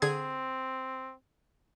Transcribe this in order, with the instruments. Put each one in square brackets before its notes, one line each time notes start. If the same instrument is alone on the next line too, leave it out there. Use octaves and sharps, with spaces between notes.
[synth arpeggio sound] D3 G#4 G#6 [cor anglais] C4